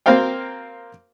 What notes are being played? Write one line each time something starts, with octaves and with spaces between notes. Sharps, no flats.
A#3 C4 A#4 C5 F5 G5